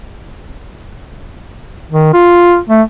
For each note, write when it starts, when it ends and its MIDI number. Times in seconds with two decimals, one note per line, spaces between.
1.92 2.09 51
2.14 2.59 65
2.70 2.82 57